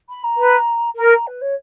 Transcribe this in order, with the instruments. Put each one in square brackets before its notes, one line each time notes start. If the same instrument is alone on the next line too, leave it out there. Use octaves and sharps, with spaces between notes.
[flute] B5
A#5
[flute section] B4
[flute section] A#4 [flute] A#5
[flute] A#5
B4
C#5